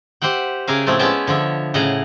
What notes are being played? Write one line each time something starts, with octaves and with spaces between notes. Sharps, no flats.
G4 C5 E5 F#5 G5
C#3 G4 G#4 A#4 E5 F5
A2 F3 A3 C4
G#3 B3 C#4 E5 G5 A5
D3 F3 C#5 E5
A2 C#3 D#5 F5 F#5 A#5